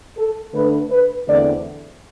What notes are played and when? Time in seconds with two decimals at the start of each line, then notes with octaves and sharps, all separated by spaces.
0.17 A4
0.53 D3 A3 D4 B4
0.91 B4
1.27 E2 D3 A3 C4 D5